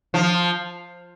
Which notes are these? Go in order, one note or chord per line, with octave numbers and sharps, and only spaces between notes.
F3